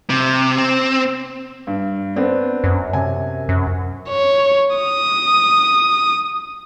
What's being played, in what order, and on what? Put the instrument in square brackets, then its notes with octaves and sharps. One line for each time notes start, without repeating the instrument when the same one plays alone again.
[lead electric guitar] C3
C4
[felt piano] G2
B3 C4 D4
[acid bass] F#2
[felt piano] C3 G#5
[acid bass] F#2
[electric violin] C#5
D#6